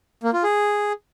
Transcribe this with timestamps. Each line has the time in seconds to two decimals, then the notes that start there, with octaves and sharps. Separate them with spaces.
0.23 A#3
0.33 F4
0.43 G#4